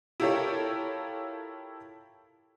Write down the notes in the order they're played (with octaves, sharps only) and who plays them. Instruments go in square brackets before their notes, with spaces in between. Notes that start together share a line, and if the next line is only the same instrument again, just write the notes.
[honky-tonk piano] E4 F4 G4 A4 A#4 C#5